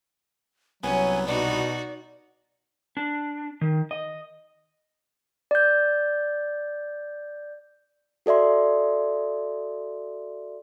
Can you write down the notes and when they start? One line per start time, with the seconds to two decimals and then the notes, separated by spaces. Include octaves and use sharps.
0.83 C2 F#3 B3 C#4 G#5
1.27 B2 D#4 F#4 D5
2.97 D4
3.61 D#3
3.91 D#5
5.51 D5 G6
8.26 F#4 A4 D5 E5 C6